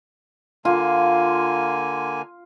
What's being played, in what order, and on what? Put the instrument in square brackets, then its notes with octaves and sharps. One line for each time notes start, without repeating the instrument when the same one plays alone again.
[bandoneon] D3 A#3 G#5 [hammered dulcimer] F4